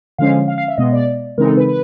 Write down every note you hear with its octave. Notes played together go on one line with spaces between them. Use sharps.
D3 F3 G#3 C#4 F5
F5
F5
E5
B2 G#3 B3 D#5
D5
C#3 E3 G#3 C4 D#4 A#4
A4
B4
B4